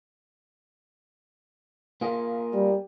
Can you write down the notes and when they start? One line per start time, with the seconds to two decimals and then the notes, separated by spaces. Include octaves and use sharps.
2.01 A#3 F4 G#4
2.54 G3